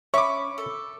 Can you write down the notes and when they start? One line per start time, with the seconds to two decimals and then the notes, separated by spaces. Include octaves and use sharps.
0.14 C#4 C#5 E5 B5 C#6 D6
0.58 A4